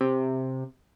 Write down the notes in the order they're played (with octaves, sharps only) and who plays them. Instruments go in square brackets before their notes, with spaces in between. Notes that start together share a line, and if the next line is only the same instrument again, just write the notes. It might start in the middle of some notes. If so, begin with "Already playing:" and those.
[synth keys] C3